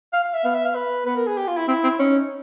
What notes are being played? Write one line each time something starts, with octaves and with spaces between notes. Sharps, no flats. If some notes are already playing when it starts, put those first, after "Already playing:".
F5
F5
E5
B3 F5
E5
F5
B4
B3 B4
A#4
G#4
G4
F4
E4
C4 E4
C4
C#4 D#4